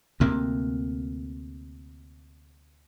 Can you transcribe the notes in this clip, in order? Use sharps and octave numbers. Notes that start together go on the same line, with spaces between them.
D2 C3 A#3